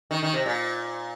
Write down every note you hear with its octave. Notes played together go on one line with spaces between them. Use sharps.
D#3
D#3
C3
A#2